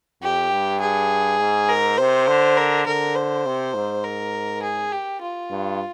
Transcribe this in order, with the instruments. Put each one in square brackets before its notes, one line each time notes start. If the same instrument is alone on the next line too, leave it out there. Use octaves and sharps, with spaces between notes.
[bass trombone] F2 [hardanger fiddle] G4
[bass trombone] G2
[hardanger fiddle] G#4
[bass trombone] G#2
[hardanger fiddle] A#4
[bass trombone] C3 [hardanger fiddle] C5
[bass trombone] D3
[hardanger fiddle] A#4
[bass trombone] D3 [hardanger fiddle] A#4
[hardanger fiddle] C5
[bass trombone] C3
G#2
[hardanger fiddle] A#4
G#4
G4
F4
[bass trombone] G2